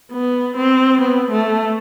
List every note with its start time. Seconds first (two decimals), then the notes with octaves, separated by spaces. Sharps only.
0.12 B3
0.57 C4
1.01 B3
1.31 A3